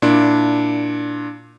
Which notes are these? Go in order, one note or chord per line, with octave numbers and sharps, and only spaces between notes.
A#2 D4 E4